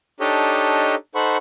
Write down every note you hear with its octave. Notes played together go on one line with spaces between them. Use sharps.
D4 D#4 G4 A4 C#5 D#5
D#4 A4 C5 F#5 B5 C#6